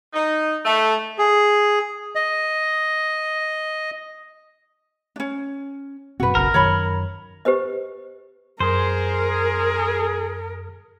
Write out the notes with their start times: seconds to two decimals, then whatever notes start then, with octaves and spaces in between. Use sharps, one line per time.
0.14 D#4
0.65 A3
1.18 G#4
2.15 D#5
5.16 C#4 D4
6.20 F#2 B2 C4 F#4 B4
6.35 F#1 B1 C#3 A#4
6.54 F#2 D#3 C#5 B5
7.45 G4 B4 C5 D#5
8.60 F#2 G#4 A#4 C5